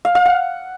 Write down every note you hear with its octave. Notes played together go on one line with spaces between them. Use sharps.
F5
F5
F#5